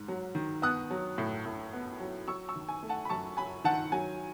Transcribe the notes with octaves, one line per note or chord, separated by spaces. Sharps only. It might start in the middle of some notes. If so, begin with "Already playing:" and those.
Already playing: G#2
F#3
D#3
B3 D#6 F#6
F#3
A2
A2
B3
F#3
F#3 C#6 E6
C#6 E6
D#3
G#5
A3
F#5 A5
B5
F#2 A5 C#6
F#3 G#5 B5
D#3 F#5 A5
F#3 G#5